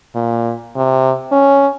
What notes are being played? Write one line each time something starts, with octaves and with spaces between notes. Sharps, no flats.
A#2
C3
C#4